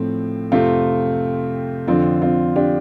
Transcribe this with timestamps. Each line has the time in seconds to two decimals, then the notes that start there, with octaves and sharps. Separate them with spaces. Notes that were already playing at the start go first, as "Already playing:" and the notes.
Already playing: A2 F3 A3 C4
0.52 F2 C3 A3 C4 F4
1.87 F2 D3 F3 C4 F4
2.21 C4 F4
2.56 D4 G4